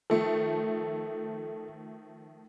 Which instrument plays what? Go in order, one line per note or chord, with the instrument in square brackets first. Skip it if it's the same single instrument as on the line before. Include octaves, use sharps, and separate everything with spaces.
[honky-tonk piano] D#3 F3 A3 [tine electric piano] A4